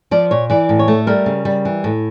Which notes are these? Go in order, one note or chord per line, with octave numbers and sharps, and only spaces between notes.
F3 D5
A#2 C#5
E3 D5
A2
C#5
A3
G3 A#4
C#3
G3
E3
A2